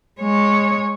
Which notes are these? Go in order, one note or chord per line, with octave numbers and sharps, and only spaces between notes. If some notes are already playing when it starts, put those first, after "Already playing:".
G#3 C#5